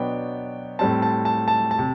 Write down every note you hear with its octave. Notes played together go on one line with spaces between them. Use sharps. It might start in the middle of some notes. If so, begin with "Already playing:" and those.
Already playing: B2 F#3 B3 D4 G5
A2 G3 C4 A5
A5
A5
A5
A5
C3